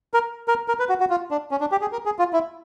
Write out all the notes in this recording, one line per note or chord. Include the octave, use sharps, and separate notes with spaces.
A#4
A#4
A#4
B4
F#4
F#4
F4
D4
C#4
D4
G4
G#4
A#4
G#4
F4
E4